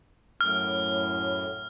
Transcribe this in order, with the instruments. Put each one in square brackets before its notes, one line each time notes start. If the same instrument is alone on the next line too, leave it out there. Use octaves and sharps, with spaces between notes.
[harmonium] F#2 A2 [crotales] F6